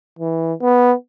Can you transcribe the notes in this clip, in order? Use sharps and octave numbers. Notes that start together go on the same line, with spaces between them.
E3
B3